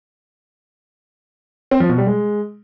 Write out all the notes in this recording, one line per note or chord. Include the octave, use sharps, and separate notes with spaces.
C4
F3
B2
G3
G#3